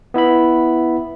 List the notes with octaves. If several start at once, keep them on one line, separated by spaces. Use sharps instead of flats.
B3 E4 E5 B5